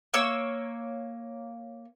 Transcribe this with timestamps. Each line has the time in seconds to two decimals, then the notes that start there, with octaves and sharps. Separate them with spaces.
0.14 A#3 C#5 E6